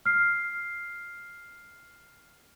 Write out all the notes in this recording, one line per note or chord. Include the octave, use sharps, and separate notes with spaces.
F6 C7